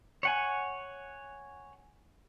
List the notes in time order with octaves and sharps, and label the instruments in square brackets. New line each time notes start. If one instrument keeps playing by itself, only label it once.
[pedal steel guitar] C#5 F#5 G#5